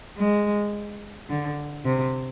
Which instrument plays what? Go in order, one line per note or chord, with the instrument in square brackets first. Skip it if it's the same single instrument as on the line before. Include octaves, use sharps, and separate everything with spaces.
[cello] G#3
D3
C3